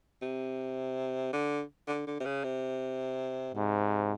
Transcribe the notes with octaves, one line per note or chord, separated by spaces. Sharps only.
C3
D3
D3
D3
C3
C#3
C3
G#2 C3